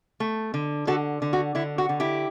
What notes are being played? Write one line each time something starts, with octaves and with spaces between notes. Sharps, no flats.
A3
D3
D3 F#4 A4
D3
F#4
D3 E4
F#4
D3
E4 G4